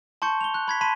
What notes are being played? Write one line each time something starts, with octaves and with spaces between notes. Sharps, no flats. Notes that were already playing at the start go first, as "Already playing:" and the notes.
A5 C6 C#6 G6 C#7
F7 G7
F#6
B5 G#6 B6
A5 B5 C6 B6 D#7